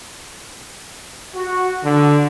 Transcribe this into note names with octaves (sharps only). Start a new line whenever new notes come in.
F#4
D3